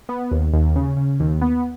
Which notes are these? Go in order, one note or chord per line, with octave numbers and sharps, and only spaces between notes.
B3
D#2
D#2
C#3
C#3
D#2
B3